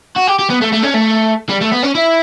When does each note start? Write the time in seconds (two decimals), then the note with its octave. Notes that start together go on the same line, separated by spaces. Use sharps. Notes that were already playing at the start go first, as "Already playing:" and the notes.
0.16 F#4
0.27 G4
0.39 G4
0.50 B3
0.62 A3
0.73 A3
0.83 C#4
0.95 A3
1.49 G3
1.62 A3
1.72 B3
1.83 C#4
1.95 E4